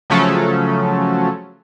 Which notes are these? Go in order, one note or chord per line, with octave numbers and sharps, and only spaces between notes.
C#3 F3 F#3 A3 C#4 A4